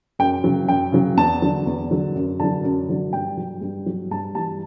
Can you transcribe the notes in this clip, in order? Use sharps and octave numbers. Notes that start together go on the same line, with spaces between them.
F#2 G5
C#3 F#3
F#2 G5
C#3 F#3
E2 A5
D3 F#3
E2
D3 F#3
F#2
D3 F#3 A5
F#2
D3 F#3
G2 G5
F#3
G2
F#3
G2 A5
E3 G3 A5